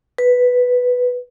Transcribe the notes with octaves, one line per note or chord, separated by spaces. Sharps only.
B4